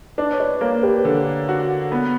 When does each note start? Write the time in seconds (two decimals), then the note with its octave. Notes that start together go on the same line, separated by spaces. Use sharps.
0.18 D4 B4 D5
0.33 C#5
0.40 B4 D5
0.61 A#3 A#4 C#5
0.83 G4 B4
1.05 D3
1.49 F#4
1.92 B3